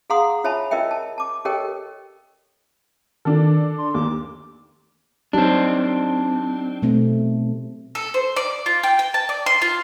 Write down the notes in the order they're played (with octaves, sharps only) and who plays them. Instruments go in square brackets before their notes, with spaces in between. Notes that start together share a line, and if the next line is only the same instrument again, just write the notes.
[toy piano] G#4 F5 F#5 A#5 C6 D#6
F4 C#5 E5 G#5 A5 B5
F4 A#4 D#5 E5 G5
A5
A5 D6
G4 A4 A#4 C#5 D#5 G5
[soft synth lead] D#3 [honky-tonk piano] D4 A4
[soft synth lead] C6
[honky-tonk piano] D#2 [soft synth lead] D6
[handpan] F#3 D#4 G4 [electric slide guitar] C4 D4
[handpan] B2 A3 C4
[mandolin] A4
C5
D5
F4
G5
G5
A5
D5
C6
F4